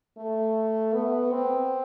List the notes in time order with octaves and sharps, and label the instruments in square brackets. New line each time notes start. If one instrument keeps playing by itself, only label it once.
[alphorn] A3
B3
C4